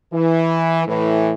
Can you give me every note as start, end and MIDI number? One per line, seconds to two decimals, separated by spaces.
0.14 0.87 52
0.88 1.33 45
0.88 1.33 52